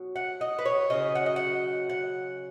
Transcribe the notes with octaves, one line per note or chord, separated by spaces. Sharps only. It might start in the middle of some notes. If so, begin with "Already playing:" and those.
Already playing: B2 F#3
F#5
D#5
B4
C#5
C#3 F#3 D#5
F#5
D#5
F#5
F#5